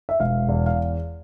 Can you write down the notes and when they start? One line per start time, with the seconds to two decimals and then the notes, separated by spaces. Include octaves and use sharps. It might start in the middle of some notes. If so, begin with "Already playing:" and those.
0.09 E5
0.20 E1 F5
0.48 E2
0.66 F5